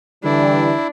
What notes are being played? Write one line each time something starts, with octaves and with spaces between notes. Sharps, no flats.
D3 E3 G3 D4 E4